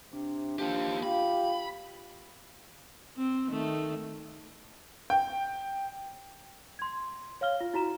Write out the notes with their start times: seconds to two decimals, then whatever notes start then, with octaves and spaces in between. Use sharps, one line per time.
0.13 C3 D4
0.59 F3 A#3 G4
1.03 F4 G4 F5 B5
3.16 C4
3.51 D#3 A3
5.10 G5
6.79 C6 G#6
7.41 C#5 F5 F6 G7
7.60 F4
7.74 E4 F#4 A#5 E7